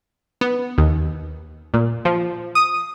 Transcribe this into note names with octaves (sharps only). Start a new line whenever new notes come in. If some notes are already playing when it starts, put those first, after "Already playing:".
B3
D#2
A#2
F3
D#6